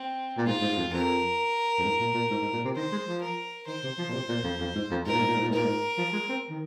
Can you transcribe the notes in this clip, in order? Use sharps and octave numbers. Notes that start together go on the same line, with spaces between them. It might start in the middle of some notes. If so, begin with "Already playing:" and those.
Already playing: C4
A#2
G#2 F4
G#2
G#2
F2
F2 A#4
F2
G#2
A#2
A#2
G#2
G#2
A#2
C3
D#3 C5
G#3
F3
A#4
D#3 C5
C3
F3
A#2
C3
A#2
F2
F2
G#2
F2
G#2 A#4
A#2
G#2
A#2
G#2
A#2
G#2
A#2 A#4
G#2
F3
G#3
C4
D#3